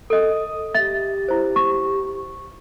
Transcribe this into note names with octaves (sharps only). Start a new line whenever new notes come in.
A4 D#5 D#6
G4 E5 A6
E4 C5
C#6